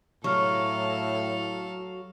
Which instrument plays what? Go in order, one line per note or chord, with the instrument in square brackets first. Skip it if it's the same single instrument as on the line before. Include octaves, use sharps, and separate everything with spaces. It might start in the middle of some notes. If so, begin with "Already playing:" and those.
[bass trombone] A2 [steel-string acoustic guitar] F#3 [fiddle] A4 F5 [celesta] C#6 F6